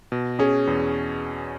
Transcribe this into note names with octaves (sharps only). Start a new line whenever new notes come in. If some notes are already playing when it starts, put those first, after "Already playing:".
B2
C#4 G#4
E2